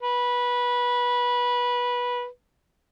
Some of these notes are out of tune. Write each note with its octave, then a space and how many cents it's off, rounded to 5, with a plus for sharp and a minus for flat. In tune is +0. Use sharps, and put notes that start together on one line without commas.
B4 -15